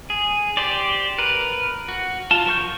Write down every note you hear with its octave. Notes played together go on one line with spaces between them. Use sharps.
G#4
G4 C5 D5
A#4 B4
F#4
F4 A5
F3 A#4 C#6 G6